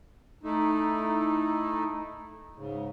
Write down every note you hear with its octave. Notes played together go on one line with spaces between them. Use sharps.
A3 D#4 E4
G#2 C#3